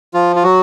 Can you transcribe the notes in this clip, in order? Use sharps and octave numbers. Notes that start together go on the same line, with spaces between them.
F3 F4
F4
F#3 F#4